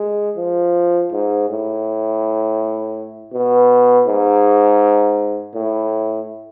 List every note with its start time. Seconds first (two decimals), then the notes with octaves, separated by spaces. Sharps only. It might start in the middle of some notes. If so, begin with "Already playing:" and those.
Already playing: G#3
0.37 F3
1.12 G#2
1.49 A2
3.33 B2
4.07 G#2
5.54 A2